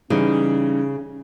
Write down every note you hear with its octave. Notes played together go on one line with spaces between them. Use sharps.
C#3 E3 G3 C#4 D#4